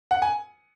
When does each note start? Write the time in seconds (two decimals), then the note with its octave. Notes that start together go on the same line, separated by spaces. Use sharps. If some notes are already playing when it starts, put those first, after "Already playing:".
0.11 F#5
0.22 G#5